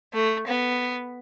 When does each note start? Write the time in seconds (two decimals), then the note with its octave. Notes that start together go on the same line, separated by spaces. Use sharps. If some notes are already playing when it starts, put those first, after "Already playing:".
0.14 A3
0.47 B3